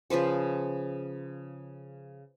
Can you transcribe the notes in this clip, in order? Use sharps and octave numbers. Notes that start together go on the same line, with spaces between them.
C#3 F3 B4 C5